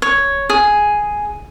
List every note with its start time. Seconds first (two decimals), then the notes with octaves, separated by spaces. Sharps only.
0.02 C#5
0.49 G#4